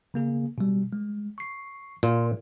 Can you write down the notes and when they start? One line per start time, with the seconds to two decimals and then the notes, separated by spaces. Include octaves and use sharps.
0.14 C#3 A#3 G#4
0.58 B2 G3
0.93 G#3
1.38 C#6 C7
2.03 A#2 A#4 C6